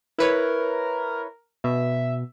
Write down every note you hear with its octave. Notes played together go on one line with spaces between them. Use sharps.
E4 A#4 B4 C#5
B2 E5